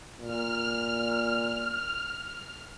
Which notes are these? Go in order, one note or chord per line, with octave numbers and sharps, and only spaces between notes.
A#2 F6